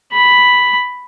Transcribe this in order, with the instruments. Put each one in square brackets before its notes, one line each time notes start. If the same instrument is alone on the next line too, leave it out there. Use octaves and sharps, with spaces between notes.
[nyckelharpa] B5